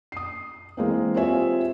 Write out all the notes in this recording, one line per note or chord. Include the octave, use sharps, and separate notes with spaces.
D#6 C7
E3 G#3 A#3 C4
C4 F4 G4 C#5 E5 G#5